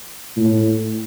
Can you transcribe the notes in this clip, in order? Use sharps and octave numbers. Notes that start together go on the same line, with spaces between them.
A2